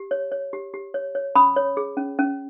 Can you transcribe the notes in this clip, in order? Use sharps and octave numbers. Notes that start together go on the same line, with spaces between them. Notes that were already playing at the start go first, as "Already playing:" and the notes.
Already playing: G4
C#5
C#5
G4
G4
C#5
C#5
C#4 B5 D#6
C#5
G#4
C#4
C#4